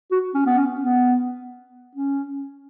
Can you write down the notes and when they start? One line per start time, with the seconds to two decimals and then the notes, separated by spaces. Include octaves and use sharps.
0.12 F#4
0.34 C#4
0.46 B3
0.58 C#4
0.81 B3
1.95 C#4